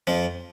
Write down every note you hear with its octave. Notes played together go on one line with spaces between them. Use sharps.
F2 F3